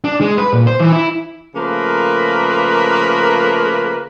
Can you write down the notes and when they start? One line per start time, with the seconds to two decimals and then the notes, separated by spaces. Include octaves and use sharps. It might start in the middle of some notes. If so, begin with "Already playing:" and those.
0.04 D4
0.21 G#3
0.38 B4
0.53 A#2
0.67 C5
0.80 E3
0.93 E4
1.55 C#3 F3 A3 A#3 A#4 B4